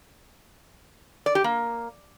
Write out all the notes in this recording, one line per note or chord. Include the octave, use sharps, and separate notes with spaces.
D5
G4
A#3